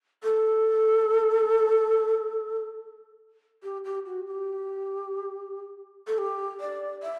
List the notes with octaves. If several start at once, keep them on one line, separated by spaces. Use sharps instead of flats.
A4
G4
G4
F#4
G4
A4
G4
D5
E5